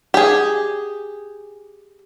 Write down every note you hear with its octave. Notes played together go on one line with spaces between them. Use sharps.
G4 G#4